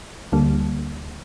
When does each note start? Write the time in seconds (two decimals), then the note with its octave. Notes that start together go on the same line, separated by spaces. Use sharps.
0.32 D2 D3 G3 A#3